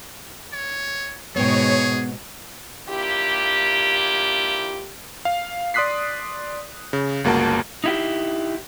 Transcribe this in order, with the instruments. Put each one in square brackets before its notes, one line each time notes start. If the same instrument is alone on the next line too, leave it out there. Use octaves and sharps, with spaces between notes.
[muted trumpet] C#5
[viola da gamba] G#2 B2 [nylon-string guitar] B3 G5 [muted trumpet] G#4 [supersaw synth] C#5
[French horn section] A#3 D4 E4 F4 G4
[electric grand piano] F5
D5 C6 D#6 F#6 B6 C7
C#3
G1 C#2 A#3 F#4 A5
[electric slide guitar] D#4 E4 G4